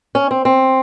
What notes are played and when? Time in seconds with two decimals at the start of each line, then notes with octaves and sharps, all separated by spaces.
0.15 C#4
0.31 C4
0.45 C4